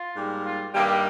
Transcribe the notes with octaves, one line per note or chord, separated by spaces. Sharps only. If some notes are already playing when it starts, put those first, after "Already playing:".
Already playing: F4
G#2 G3 A#3
F4
G2 D#3 G3 A#3 G4